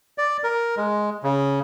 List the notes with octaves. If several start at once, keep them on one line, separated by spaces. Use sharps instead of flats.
D5
A#4
G#3
C#3